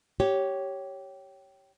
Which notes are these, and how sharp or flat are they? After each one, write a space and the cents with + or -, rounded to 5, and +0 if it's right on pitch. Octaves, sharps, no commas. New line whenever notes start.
G4 -15 C#5 +0